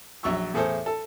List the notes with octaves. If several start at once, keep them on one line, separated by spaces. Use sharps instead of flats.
A#1 F#3 E5 C#6 E6
E2 A2 G#4 A4 C5
A4